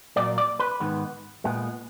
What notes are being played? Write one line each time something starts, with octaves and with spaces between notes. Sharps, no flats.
A#2 F#3 A#3 D5
D5
B4
G#2 D#3 G#3 B3
A#2 G#3 B3